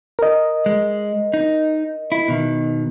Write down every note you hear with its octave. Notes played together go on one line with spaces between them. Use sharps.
A#4 D#5
G#3
D#4
E4
B2 D#3